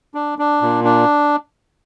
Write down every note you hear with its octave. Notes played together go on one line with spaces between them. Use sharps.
D4
D4
A#2
D4